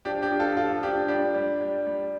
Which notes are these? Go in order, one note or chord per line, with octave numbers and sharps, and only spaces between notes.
F3 D4 G4
D4 G4
F3
F4 A4
F3 F4 A4
F3 D4 G4
G3 D4 G4
G3
G3
G3